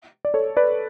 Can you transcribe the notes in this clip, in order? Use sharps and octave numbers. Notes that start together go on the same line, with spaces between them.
D5
A4 C#5
B4 D5